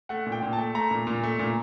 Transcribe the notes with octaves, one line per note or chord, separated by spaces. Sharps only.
A3 F#5
A#2
G5
A#2
A5
A3
A3 A#5
A#2
A#2
A3
A#2